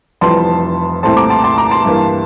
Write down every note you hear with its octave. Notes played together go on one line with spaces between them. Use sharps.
F1 F2 E3 G3 A5 C6
C2 A#2 A3 C4 A5 C6
A#5 D6
A5 C6
A5 C6
A#5 D6
A5 C6
G2 E3 A#3